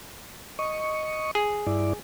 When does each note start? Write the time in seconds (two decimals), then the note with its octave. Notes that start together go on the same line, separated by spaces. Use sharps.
0.59 D#5 C#6
1.35 G#4
1.67 G2 E4 D5